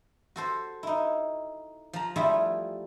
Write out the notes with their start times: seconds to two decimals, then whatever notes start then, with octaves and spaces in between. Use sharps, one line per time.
0.36 F#4 A4 C5
0.83 D#4 E4
1.93 F3 A#5
2.16 F3 G3 A3 E4 F4 G#4